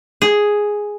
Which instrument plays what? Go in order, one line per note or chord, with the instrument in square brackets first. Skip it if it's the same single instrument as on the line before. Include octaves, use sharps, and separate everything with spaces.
[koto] G#4